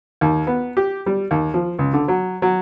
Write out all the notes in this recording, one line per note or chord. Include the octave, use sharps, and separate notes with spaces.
D#2
B3
G4
G3
D#2
F3
C#2
D3
F#3
F#3